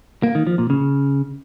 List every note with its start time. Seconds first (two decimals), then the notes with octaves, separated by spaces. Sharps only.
0.23 A#3
0.35 D#3
0.47 F3
0.58 A#2
0.70 C#3